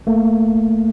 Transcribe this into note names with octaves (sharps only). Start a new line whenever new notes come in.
A3 A#3